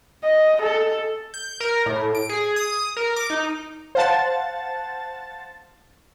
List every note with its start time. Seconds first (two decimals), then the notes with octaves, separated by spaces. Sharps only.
0.24 D#5
0.61 A4
1.34 G6
1.60 A#4
1.86 A2
2.15 D7
2.29 G#4
2.56 D#6
2.97 A#4
3.16 D6
3.30 D#4
3.95 C5 F5 F#5 A5 A6